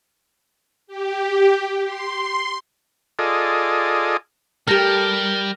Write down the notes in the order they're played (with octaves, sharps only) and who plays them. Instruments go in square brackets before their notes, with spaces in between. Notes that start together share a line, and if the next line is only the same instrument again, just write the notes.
[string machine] G4
C6
[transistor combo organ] F4 G#4 A4 D5 D#5
[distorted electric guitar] G3 [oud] G4 A4 [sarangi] A#4 [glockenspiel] F6 A#6 F7